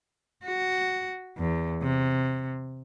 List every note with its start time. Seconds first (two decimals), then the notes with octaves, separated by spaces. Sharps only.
0.45 F#4
1.38 E2
1.83 C3